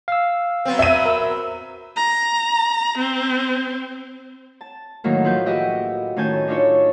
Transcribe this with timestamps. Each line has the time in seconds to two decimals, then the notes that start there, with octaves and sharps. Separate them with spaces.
0.08 F5 E6
0.65 F#3 B3 C4
0.79 E5 D#7
1.06 A#4 E6
1.96 A#5
2.98 C4
4.61 A5
5.04 A2 D#3 F#3 A#3
5.24 F3 B4 G6
5.46 F#4 G4 B4 D#5 E5 G5
6.16 A2 D#3 C#4 G#5 A5 G6
6.48 D4 D#4 F4 A4 C#5